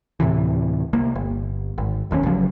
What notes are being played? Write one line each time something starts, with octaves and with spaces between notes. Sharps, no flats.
D2 A2 C3 E3
C2 A#3
G1
G#1
E1 D#2 F3 C#4
G1 C#3 F3 F#3